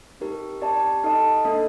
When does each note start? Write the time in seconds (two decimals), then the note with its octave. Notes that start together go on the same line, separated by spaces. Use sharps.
0.20 C4 D#4 G4 A#4
0.62 C4 G4 D5 A5
1.04 D#4 A4 D#5 A5
1.45 A#3 D4 A4 D#5